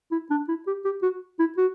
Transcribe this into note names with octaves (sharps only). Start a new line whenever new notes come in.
E4
D4
E4
G4
G4
F#4
E4
F#4